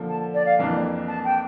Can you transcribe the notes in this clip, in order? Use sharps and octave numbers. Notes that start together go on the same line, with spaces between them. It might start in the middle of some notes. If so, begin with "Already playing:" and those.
Already playing: D3 F3 A#3
A5
D5
F5
F2 E3 A#3 D4
A5
G5